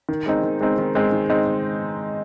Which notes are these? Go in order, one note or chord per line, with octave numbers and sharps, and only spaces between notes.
D#3
G#3 C4 D#4
D#3
G#3 C4 D#4
D#3
G#3 C4 D#4
D#3
G#3 C4 D#4